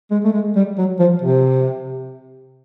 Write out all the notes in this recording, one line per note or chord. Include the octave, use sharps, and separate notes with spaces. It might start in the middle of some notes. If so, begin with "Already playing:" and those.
G#3
A3
G#3
G3
F#3
F3
C3